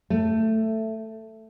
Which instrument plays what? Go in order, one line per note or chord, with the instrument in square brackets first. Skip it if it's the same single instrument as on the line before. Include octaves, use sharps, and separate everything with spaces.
[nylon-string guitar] A3